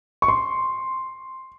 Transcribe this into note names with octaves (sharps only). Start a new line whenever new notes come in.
C#6
C6